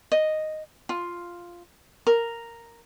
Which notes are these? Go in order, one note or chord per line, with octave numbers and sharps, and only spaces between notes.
D#5
F4
A#4